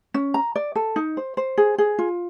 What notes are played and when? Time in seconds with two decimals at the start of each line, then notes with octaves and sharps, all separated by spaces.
0.14 C#4
0.34 A#5
0.55 D5
0.76 A4
0.96 D#4
1.17 C5
1.37 C5
1.58 G#4
1.78 G#4
1.99 F4